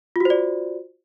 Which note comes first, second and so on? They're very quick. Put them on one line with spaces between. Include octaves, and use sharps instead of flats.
F4 F#4 C5 D5